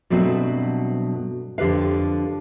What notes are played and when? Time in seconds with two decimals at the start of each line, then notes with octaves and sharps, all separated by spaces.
0.10 G2 B2 F#3 A3 C4
1.58 F2 D3 G4 B4 F5